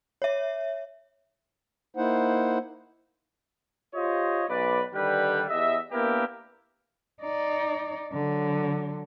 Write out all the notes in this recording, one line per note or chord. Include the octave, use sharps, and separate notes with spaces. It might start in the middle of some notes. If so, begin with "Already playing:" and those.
C#5 E5
A#3 D#4 E4 C5 F#5
F4 G4 C5 C#5 D#5
B1 B4 D5
D3 D#3 G3 G4 B4
E2 G4 D#5 E5
A#3 B3 D4 E4 G4 A#4
D#4 D5
D3 F#3